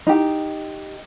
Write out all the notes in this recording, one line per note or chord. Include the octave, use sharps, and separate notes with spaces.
D#4 G4